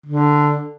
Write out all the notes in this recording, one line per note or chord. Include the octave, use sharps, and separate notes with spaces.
D3